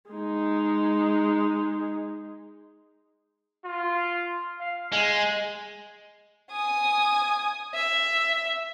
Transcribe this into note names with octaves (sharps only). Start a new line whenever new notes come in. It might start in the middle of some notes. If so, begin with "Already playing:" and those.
G#3 D#4
F4
F5
G#3 G#5
G#5 D#6
E5